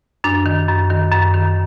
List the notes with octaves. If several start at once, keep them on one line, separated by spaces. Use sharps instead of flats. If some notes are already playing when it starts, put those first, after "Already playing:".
F#2 D4
D#3
F#2
D#3
F#2
D#3